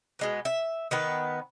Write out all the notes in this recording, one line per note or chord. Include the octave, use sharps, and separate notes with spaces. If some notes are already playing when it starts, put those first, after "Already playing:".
B2 G#3 B3
E5
D#3 B3 B4